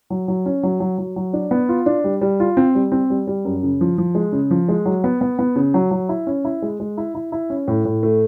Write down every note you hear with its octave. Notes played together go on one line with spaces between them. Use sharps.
F#3
F#3
C#4
F#3
F#3
F#3
F#3
D4
B3
F4
D4
G3
G3
F4
C4
G3
C4
G3
G3
F#2
C#3
F3
F3
G#3
C#3
F3
G#3
F#3
B3
B3
B3
C#3
F#3
F#3
E4
C#4
E4
G#3
G#3
E4
E4
E4
C#4
A2
A2
A3